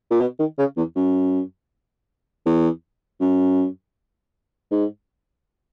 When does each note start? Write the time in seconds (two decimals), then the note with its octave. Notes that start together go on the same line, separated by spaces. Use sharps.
0.11 A#2
0.21 B2
0.39 D#3
0.58 C#3
0.77 E2
0.95 F#2
2.46 E2
3.21 F#2
4.71 G#2